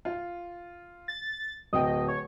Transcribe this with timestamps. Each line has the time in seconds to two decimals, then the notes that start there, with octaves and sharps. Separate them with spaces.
0.05 F4
1.08 A6
1.73 D1 D#5 G5
2.08 C#5